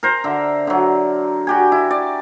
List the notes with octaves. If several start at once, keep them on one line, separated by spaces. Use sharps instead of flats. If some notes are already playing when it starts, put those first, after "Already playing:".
A#4 C5 A#5
D3 E5
D3 F#3
F#4 G4 G#5
E4
D5